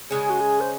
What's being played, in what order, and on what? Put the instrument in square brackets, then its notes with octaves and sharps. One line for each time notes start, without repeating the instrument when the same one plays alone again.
[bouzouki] C#3 G#3 C#4 [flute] G#4
[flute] F#4
G#4
C5